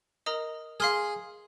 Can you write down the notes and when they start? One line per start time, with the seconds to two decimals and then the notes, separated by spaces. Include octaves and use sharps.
0.26 A#4 D#5 A#5 D#6
0.80 G#4 F5 C6 F6